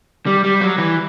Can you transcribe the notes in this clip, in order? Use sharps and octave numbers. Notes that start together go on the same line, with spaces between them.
G3
G3
F#3
E3